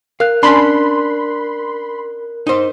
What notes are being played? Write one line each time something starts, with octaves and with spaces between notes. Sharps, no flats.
A#4 F5 F#6
C#4 D4 B5 C6
D#4 C5